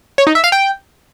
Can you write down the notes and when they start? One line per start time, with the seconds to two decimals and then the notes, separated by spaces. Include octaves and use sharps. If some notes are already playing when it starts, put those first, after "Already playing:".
0.18 C#5
0.27 D#4
0.35 E5
0.44 F5
0.52 G5